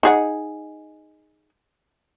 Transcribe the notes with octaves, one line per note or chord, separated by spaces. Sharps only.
D#4 G#4 F#5